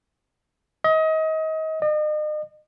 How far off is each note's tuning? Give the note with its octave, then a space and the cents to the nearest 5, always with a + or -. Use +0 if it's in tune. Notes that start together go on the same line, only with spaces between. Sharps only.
D#5 +30
D#5 -40